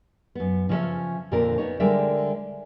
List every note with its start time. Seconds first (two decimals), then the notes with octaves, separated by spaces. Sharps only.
0.35 F#2 B3
0.69 C#3 F3 G#3 C#4 E5
1.32 F2 A#2 D3 F3 D4 A#4
1.58 B3 D#4 C#5
1.80 D3 G3 G#3 A#4 D5 E5